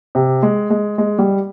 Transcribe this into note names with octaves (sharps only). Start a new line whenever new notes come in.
C3
G#3
G#3
G#3
G3